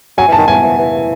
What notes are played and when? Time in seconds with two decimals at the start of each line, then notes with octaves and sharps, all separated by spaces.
0.18 F#3 G#5
0.28 E3
0.32 A5
0.38 D#3
0.47 E3 G#5
0.63 E3
0.78 E3